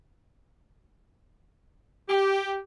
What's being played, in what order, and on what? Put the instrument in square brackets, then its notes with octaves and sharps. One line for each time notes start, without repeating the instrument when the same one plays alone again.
[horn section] G4